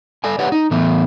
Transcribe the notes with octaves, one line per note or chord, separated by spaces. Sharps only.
A4 D5 G#5
G4 B4 C#5 D5 F#5
D#4
A2 E3 A3 B3